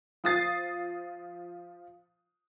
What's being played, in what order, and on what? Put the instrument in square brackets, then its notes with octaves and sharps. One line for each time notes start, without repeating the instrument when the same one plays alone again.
[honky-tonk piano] F3 D#6 A6 C7